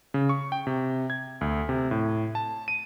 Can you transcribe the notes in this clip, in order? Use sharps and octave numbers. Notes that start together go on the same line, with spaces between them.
C#3
C#6
G5
C3
G#6
D2
C3
A2
A5
D#7